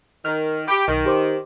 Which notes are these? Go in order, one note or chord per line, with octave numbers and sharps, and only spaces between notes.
D#3 A#4 F6
G4 B5
B1 D#3
G4 C5 D6